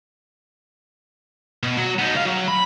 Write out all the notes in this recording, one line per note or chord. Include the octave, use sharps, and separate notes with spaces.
B2
F#3
B3 D#4
C#2 F5
F#3
B5